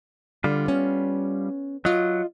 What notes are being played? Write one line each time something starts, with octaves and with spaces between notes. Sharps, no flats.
D3 G3 F4
B3 C#4
F#3 F4 D#5